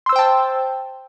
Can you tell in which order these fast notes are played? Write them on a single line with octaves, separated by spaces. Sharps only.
C6 E6 C5 G5 A5